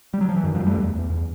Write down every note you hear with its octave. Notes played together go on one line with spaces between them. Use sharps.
G3
F#3
F3
E3
F#2 D#3
F3 G3
F#2
G3 A3
E2
E2
E2